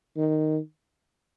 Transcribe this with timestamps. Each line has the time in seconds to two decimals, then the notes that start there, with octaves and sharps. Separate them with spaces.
0.17 D#3